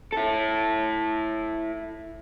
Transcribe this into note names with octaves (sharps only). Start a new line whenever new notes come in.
E4 A4